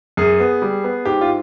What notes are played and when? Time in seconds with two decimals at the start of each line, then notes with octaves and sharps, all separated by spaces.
0.17 F#2 G#4
0.40 B3
0.62 G3
0.84 B3
1.05 G#2 G4
1.21 F4